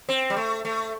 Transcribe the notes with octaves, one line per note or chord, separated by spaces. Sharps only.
C4
G3
A3
A3